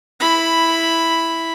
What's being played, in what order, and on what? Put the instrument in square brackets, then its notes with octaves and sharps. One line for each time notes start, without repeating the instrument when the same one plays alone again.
[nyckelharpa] E4 B5